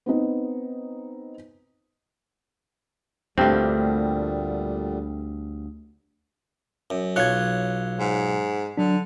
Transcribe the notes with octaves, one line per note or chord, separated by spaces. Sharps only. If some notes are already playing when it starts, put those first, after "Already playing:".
B3 C4 D#4
D2 G2 A#2 D3 G3 A3 C4 G4
F#2
B1 F4 C#5 F#6 G#6
G#2
D3 F#3 D4